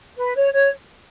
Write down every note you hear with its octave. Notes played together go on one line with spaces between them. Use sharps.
B4
C#5
C#5